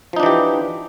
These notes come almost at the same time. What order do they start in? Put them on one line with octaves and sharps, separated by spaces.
F3 D#4 D4 E3 G4